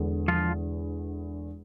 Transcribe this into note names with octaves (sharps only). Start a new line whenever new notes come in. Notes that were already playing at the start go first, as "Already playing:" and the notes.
Already playing: E1 E2 D3
F3 F4